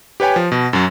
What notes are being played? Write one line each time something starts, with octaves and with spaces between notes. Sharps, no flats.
G4 B4 C#5 G5 G#5
F3
B2
F#2 F#3